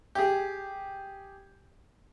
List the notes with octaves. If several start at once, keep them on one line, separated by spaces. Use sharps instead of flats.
G4 G#4